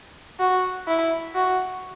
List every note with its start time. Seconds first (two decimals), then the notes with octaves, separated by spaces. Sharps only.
0.40 F#4
0.87 E4
1.35 F#4